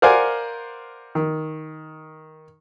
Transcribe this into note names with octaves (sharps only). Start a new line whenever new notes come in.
A#4 C5 D5 F5 F#5 G#5
D#3